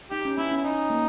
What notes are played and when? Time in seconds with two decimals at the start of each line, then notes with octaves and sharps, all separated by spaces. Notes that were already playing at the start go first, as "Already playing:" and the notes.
0.11 D#4 G4
0.25 C#4
0.37 B3 E4
0.51 C#4
0.57 E4
0.64 D#4
0.90 A#3